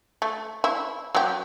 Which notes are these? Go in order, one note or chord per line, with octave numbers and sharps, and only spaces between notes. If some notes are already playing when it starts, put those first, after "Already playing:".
A3
E4
F#3 G4